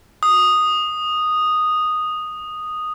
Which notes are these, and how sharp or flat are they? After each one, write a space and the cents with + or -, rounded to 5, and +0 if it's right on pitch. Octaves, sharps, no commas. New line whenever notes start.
D#6 -5